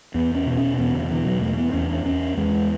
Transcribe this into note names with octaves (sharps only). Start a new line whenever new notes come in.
E2 B3
C#4
B2
C#4
E2 B3
D3
B2 E3
F#3
E2 A3
B3
E2 C#4
D4
E2 C#4
E2 G#3